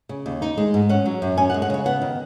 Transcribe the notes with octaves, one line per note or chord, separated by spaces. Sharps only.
C#3
D#2
D#4
G#3
G#2
C#4 F#5
F#3
F#2
C#4 G#5
F#5
G#3
F#5
C#3 C#5
B3 F#5
D#3